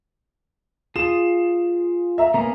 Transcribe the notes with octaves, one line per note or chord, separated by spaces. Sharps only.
F4 G#4 D#6 E7
E5 A#5
A#3 B3 C#4 A#5